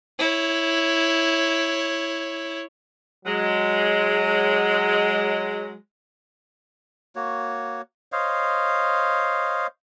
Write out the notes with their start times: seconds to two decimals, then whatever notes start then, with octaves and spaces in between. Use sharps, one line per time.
0.19 E4 C#5
3.26 F#3 G#3
7.16 A#3 F#4 C#5
8.12 C5 C#5 D#5 F5